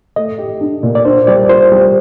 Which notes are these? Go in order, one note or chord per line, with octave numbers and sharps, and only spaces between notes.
A3 D#5
G4
D4
A#2
D5
D4 C5
G3 D5
F4 C5
G3